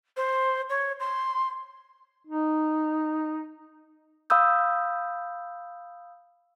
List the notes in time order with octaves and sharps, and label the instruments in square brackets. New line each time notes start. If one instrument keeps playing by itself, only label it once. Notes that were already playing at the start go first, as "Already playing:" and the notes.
[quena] C5
C#5
C6
[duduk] D#4
[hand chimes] F5 B5 D#6 E6 G6